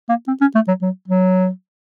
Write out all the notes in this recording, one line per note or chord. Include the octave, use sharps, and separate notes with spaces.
A#3
C4
C#4
A3
F#3
F#3
F#3